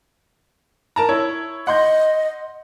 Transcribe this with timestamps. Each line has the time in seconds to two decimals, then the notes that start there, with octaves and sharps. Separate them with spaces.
0.96 A#4 A5 A#5
1.09 E4 C#5
1.67 D#5 F#5 C6 G6